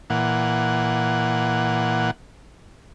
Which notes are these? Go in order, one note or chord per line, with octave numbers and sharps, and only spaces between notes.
A#2 E3 F#5